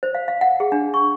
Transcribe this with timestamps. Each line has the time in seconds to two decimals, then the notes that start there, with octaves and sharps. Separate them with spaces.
0.03 C5
0.15 F5
0.28 F5
0.41 F#5
0.60 G#4
0.72 D4
0.94 C#6